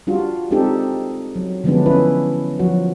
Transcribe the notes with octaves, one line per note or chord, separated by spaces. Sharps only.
G3 D4 F4 F#4
G#3 C4 D4 D#4 G4 A4
F#3
D3 F3 F#3 G#3 B3 D4
C#4 E4 B4
F3 F#3 F#4